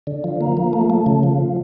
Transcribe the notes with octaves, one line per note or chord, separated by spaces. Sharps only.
D3
F3
A#3
F3
A3
A3
C#3
F3